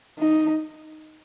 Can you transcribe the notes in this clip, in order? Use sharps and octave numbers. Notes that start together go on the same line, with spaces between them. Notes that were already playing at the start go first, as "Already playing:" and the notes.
D#4